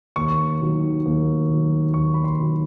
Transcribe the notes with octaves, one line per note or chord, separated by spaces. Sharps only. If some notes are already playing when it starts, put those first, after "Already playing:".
D#2 C#6
D#3 F#3
D#2
D#3 F#3
D#2 C#6
B5
C6
D#3 F#3